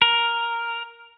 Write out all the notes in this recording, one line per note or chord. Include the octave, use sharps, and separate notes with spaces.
A#4